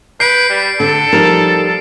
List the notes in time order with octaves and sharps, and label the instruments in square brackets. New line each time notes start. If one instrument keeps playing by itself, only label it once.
[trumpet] B4 [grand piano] G6 [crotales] C7 D7
[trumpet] G3
[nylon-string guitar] D3 [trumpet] A4
[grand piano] F3 G3 [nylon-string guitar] D#4 A#4